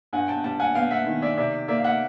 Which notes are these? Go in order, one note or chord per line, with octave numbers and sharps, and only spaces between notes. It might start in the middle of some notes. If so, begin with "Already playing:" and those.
G2 F#5 G#5
G5 A5
G3 G5 A5
F#5 G#5
B3 F5 G5
E5 F#5
D#3
D5 E5
C3 D5 E5
A#3 D5 E5
F5
E5 F#5